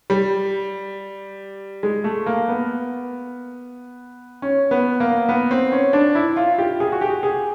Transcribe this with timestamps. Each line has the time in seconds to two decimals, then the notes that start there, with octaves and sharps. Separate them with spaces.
0.10 G3
1.83 G#3
2.04 A3
2.26 A#3
2.48 B3
4.42 C#4
4.71 B3
5.00 A#3
5.29 B3
5.51 C4
5.72 C#4
5.93 D4
6.15 E4
6.37 F4
6.58 G4
6.80 G#4
6.92 F#4
7.01 G4
7.23 G#4